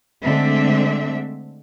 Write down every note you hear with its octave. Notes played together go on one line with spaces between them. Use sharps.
D3 G#3 A3 C4 E5